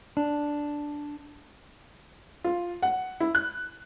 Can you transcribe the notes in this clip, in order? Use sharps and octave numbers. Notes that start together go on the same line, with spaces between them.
D4
F4
F#5
E4
F#6